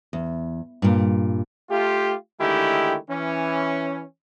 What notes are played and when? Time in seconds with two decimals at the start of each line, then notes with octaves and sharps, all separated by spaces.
0.13 E2
0.82 G2 A#2
1.70 A3 F4 G4
2.40 D3 D#3 G#3 A3 E4 G4
3.10 E3 C#4